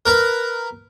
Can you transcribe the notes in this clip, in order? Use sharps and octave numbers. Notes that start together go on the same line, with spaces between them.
A#4 B4 A#5